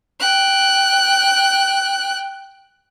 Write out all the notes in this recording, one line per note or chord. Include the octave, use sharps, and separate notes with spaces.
G5 F#6